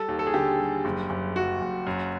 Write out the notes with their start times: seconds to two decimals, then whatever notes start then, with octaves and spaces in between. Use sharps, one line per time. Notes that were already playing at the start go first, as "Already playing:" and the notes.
Already playing: G3 A4
0.08 D#2
0.19 A4
0.27 G#4
0.34 D3 G4
0.59 G3
0.85 F#1
1.10 F#1
1.36 F#1 F#4
1.62 F#1
1.87 F#2